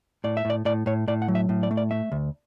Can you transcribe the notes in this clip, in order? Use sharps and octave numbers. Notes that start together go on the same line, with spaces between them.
A2 D5
E5
A2 D5
A2 D5
A2 C#5
A2 D5
F#5
F#3
E5
A2
D5
A3
D5
A3 E5
D2